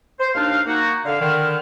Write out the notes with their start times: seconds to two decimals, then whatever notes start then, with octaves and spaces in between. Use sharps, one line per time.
0.20 C5
0.35 D#2 D4 D#4 C5 F5
0.67 A#3 D#4 F#4
1.06 D3 F5
1.21 D3 D#3 F6